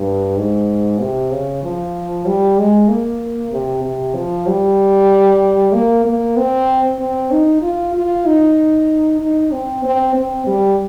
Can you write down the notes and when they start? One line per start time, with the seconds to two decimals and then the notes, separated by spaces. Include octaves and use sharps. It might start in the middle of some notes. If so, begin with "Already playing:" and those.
Already playing: G2
0.37 G#2
1.00 C3
1.31 C#3
1.63 F3
2.26 G3
2.58 G#3
2.88 A#3
3.52 C3
3.84 C3
4.15 F3
4.47 G3
5.73 A#3
6.05 A#3
6.37 C4
6.99 C4
7.31 D#4
7.62 F4
7.94 F4
8.26 D#4
9.21 D#4
9.51 C4
9.84 C4
10.15 C4
10.47 G3